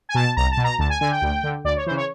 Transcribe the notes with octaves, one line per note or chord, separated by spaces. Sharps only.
G#5
B2 A5
C2 A#5
A5
B2
A#5
D2 A5
G#5
D3 G#5
G5
D2
D3
D2 D5
C#5
C#3 E3 C5
C#5